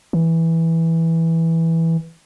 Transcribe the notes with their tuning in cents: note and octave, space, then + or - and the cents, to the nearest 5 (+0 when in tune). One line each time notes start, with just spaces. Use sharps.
E3 -5